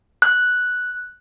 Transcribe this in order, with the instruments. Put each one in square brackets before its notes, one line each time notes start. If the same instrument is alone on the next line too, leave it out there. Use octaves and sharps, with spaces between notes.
[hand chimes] F#6